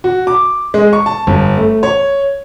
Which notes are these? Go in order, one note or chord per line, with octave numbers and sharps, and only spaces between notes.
F#4
D6
G#3
C#6
A5
G1
A3
C#5